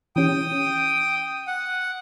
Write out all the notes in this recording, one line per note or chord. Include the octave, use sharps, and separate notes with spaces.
E3 C#4 G4 G5 D#6
F#5